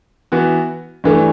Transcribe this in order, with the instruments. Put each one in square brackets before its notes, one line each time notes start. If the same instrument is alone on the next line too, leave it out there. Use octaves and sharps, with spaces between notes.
[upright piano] E3 B3 F#4
G2 E3 A3